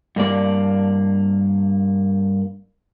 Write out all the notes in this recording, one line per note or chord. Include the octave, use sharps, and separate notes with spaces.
G2 A#3 D5